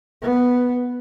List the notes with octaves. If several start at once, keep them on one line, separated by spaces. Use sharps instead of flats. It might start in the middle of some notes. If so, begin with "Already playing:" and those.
B3